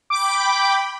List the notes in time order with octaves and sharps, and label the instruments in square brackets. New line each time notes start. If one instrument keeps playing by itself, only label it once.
[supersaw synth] G5 B5 [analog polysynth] D6